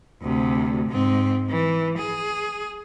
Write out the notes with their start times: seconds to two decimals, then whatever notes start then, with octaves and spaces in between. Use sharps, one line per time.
0.23 D2 C3
0.90 G#2 C4
1.50 E3
1.98 G#4